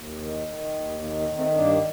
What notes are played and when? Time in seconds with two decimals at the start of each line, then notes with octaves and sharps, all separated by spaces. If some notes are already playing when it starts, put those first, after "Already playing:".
Already playing: D#2
0.21 D#3
0.47 D#3
0.74 D#2
1.01 D#3 A#3
1.19 A#3
1.28 D#3
1.37 A3 C4
1.55 G2 A#3 D4